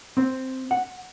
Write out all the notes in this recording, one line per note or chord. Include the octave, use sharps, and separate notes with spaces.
C4
F#5